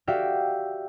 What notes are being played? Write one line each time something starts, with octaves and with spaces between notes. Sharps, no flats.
F#4 G4 D5 E5 F5 G5